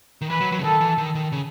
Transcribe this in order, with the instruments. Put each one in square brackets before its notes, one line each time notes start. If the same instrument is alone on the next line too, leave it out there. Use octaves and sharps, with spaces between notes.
[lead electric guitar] D#3
[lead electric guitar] E3 [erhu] B4
[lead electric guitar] F#3
F#3
C#3
[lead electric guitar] D#3 [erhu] A4
[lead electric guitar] E3
D#3
D#3
C#3